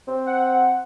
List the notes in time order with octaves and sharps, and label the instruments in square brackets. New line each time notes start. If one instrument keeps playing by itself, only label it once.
[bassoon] C4
[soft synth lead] F#5